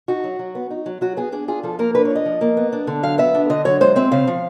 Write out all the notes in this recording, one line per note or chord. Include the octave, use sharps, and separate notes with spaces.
D#4 F#4
F#3
F#3
B3
D#4
F#3
F#3 F#4
B3 G#4
D4 G#4
F4 G#4
F3 A4
A#3 A#4
D4 B4
C#5
F4
D#5
F3
A#3
B3
D4
D3
F#3 F5
B3 E5
D4
D3 D#5
F#3 C#5
G#3 C5
C4 E5
C#3 F5
F3